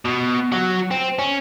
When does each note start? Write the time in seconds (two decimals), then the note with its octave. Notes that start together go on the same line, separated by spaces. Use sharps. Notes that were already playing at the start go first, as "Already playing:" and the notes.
0.05 B2
0.52 F#3 F#4
0.91 C4
1.19 C#4